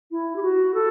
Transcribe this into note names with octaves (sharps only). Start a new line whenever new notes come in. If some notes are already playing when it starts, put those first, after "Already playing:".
E4
G4
F#4
A4